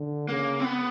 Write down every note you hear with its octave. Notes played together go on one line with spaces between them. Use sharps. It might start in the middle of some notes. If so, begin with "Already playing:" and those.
Already playing: D3
C#3 A#3
C4
B3